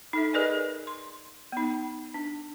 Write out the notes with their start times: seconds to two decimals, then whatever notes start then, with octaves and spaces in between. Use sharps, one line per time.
0.13 D#4 A4 E5
0.33 G#4 A#4 B4 D5 D#5 G#5
0.87 C6
1.52 B3 D#4
2.14 D4